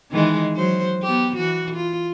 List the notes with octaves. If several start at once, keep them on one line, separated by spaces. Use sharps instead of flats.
D#3 E3 G#3
F#3 C5
B3 G4
E3 F#4
F4